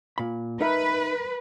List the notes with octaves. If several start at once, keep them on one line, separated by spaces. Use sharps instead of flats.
A#2 B5
D#4 A#4 B4 E5